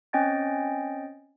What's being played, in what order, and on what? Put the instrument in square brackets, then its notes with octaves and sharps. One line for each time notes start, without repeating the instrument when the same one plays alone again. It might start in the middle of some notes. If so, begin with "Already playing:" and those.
[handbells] C4 C#4 D#5 G5 G#5 A6